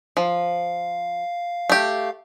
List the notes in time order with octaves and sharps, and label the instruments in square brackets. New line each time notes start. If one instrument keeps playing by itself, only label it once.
[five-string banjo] F3 [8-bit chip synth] F5
[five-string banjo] A3 G4